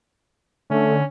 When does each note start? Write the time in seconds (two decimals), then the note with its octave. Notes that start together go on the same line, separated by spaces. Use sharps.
0.70 D3 A3 C#4